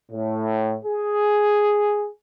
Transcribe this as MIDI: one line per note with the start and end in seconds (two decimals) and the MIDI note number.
0.11 0.75 45
0.84 2.08 68